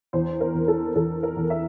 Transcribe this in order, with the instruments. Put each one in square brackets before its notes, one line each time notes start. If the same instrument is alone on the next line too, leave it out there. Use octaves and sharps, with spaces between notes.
[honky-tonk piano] E2 C5
A#4
E2
A4
E2 A4
A#4
E2
E5